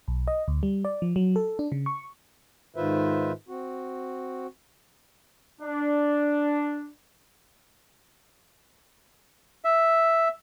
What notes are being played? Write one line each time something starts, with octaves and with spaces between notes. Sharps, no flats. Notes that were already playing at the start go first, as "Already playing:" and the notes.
B1
D#5
D2
G3
D5
F3
F#3
A4
D4
C#3
C#6
G#2 D#3 F4 B4 C5 E5
C4 F#4
D4
E5